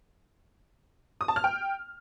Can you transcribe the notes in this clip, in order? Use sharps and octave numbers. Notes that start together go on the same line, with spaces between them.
D#6
A5
F6
G5